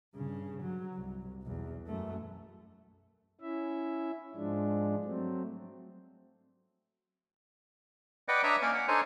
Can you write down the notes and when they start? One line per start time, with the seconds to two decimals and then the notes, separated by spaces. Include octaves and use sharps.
0.15 G2 C#3
0.63 F#3
0.94 C2
1.43 B1 E2
1.87 F#2 A3
3.41 C#4 E4 E5
4.35 G#2 F3 G#3 D4
5.05 F#3 A3 C4
8.28 B4 D5 D#5 F#5 G5
8.43 D4 C#5 D5 E5 A#5 D#6
8.62 A#3 C#4 A#4 D5
8.74 F#5
8.88 D4 D#4 A4 C5 C#5 G#5